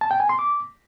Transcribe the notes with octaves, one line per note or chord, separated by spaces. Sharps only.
A5
G5
G#5
C6
D6